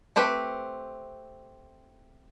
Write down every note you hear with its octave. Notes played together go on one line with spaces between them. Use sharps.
A3 C4 G4 B4